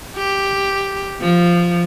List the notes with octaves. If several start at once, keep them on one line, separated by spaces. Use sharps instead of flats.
G4
F3